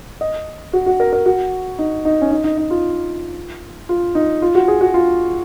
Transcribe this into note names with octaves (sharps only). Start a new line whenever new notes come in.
D#5
F#4
F#4
A#4
A#4
F#4
D#4
D#4
C#4
D#4
D#4
D#4
F4
F4
D#4
F4
F#4
G#4
F#4
F4